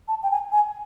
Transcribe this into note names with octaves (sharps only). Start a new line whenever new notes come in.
A5
G5
G#5
G#5